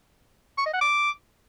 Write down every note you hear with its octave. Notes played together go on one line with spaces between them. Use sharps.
C#6
D#5
F#5
D6